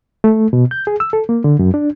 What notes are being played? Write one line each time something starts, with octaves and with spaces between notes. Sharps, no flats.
A3
B2
G6
G#4
E6
A4
A#3
D3
F#2
D4